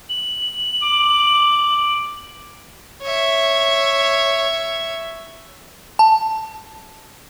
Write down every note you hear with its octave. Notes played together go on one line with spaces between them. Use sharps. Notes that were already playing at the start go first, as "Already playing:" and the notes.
F#7
D6
C#5 E5
A5